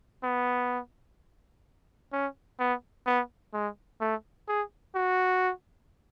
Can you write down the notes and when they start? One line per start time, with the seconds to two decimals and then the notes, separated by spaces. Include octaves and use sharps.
0.23 B3
2.13 C#4
2.59 B3
3.07 B3
3.54 G#3
4.01 A3
4.48 G#4
4.95 F#4